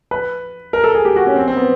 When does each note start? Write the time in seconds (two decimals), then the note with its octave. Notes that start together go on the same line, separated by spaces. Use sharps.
0.11 B4
0.73 A#4
0.84 A4
0.95 G#4
1.05 G4
1.16 F#4
1.27 C#4
1.36 C4
1.48 C4
1.57 B3